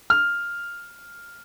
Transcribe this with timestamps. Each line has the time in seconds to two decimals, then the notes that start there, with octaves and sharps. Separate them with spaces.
0.10 F6